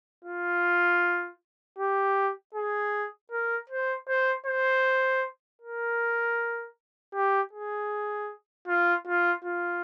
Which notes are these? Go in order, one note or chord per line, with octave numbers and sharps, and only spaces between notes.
F4
G4
G#4
A#4
C5
C5
C5
A#4
G4
G#4
F4
F4
F4